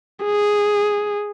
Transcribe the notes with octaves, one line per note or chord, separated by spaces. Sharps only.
G#4